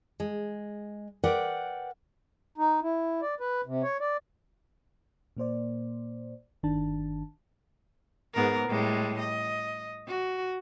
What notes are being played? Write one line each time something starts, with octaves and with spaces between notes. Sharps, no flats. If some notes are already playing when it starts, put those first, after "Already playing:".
G#3
A#4 B4 D5 F#5 G5
D#4
E4
D5
B4
C3
C#5
D5
A#2 A#3 C5 D5
G1 D#3 D4 A5
G#2 B3 A#4
A2 G3 G#3
D#5
F#4